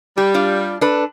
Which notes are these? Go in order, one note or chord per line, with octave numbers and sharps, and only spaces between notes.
G3 G4
D4 F4 D5
D4 A4 B4